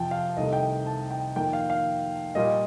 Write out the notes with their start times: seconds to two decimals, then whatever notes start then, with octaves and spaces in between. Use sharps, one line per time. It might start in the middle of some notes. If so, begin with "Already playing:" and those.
Already playing: F2 C3 F3 G5 A5
0.11 F5
0.37 C2 C3 D#3 A3 D#5
0.53 G5
0.86 A5
1.11 G5
1.36 F2 D#3 A#3 G5
1.53 F5
1.70 F5
2.35 A#2 G3 A#3 D#5